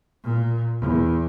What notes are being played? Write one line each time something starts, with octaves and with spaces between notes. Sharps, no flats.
A#2
E2